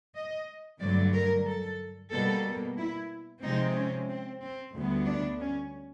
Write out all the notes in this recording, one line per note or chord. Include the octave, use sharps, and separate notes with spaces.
D#5
G2 D3 F#3 A3 D5
A#4
A4
B2 G3 A#3 A4
E4
C3 F3 G#3 C4 D#4
C#4
C4
C4
D2 D3 G3 B3
D4
C#4